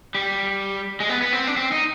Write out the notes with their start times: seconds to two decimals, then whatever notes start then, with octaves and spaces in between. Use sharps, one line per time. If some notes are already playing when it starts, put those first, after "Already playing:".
0.15 G3
1.00 G#3
1.09 B3
1.22 B3
1.33 C4
1.47 D4
1.57 C4
1.72 D#4